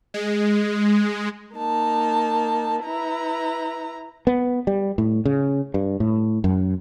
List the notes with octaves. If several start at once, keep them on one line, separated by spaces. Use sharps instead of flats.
G#3
A#3 D#4 A5
E4 B4 A#5
B3
G3
A2
C#3
G2
A2
F#2